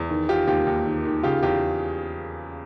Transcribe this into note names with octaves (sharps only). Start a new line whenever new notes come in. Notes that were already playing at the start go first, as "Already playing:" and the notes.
Already playing: E2
D#3
D#3 F4 G4
D#2 F4 G4
D#2
D#3
D#3
C#3 F4 G4
E2 F4 G4